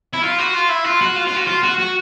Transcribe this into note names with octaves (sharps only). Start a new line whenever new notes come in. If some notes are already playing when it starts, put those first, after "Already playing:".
E4
F4
F#4
F4
E4
F4
F#4
F4
F4
F#4
F4
F#4
F#4